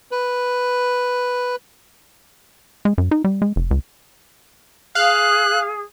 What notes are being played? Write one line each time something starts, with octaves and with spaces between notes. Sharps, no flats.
B4
G#3
F#2
D#4
G3
G#3
F1
C#2
G#4 F5 F#6